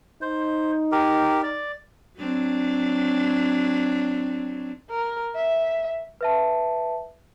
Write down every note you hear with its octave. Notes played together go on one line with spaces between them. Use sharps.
D#4 C5
G4 A#4
D5
F#3 C4 D4
A#4
E5
B4 E5 A5